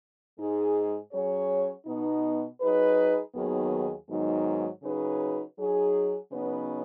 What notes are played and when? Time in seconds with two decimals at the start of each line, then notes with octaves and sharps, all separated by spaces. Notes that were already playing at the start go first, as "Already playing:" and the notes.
0.38 G#2 G#3 D#4 G#4
1.13 F#3 C#4 G#4 C#5
1.86 B2 B3 D#4
2.61 F#3 D#4 G#4 B4
3.34 D#2 D#3 F#3 B3 G#4
4.08 G#2 D#3 F#3 B3 D#4
4.82 C#3 F#3 D#4 G#4 B4
5.57 F#3 D#4 G#4
6.30 C#3 F#3 B3 D#4 B4